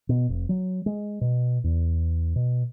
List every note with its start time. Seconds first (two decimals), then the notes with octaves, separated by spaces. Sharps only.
0.09 B2
0.29 F1
0.49 F#3
0.86 G#3
1.21 B2
1.64 E2
2.36 B2